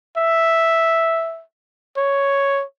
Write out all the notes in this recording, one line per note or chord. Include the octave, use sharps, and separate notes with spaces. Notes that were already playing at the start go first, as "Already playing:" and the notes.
E5
C#5